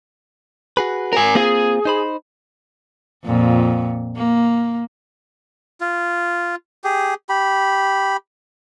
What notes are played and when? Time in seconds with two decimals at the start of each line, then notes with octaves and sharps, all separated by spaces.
0.77 F#4 G#4 B4
1.13 A#4 G#5
1.35 A#3 C4 F4 G#4
1.85 D#4 C5 B5
3.25 F2 A#2
4.16 A#3
5.81 F4
6.84 G4 G#4
7.29 G4 B5